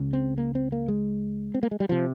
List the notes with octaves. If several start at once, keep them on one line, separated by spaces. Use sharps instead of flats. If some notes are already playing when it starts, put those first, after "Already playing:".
Already playing: C#2 C#3
C4
A#3
C4
A#3
G#3
C4
A#3
G#3
G3
C3 F3